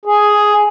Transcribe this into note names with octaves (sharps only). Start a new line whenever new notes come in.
G#4